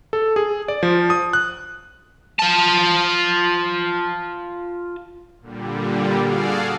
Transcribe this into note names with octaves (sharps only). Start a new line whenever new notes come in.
A4
G#4
D5
F3
D#6
F#6
F4 A5
A#2 D3 G3
F#4 G#4 A4 D5 F5